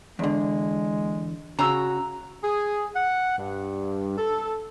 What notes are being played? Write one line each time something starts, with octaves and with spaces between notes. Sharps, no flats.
E2 D3 G#3
C#3 F#4 A#5 E6
G#4
F#5
G2
A4